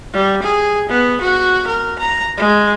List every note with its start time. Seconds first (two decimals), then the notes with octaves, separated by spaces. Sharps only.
0.13 G3
0.43 G#4
0.89 B3
1.21 F#4
1.67 A#4
1.99 A#5
2.38 G#3